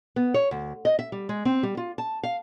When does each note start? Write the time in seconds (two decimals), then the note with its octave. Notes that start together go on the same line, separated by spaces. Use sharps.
0.16 B3
0.34 C#5
0.51 D2
0.85 D#5
0.99 E5
1.12 G3
1.29 G#3
1.45 C4
1.63 G3
1.77 F4
1.98 A5
2.23 F5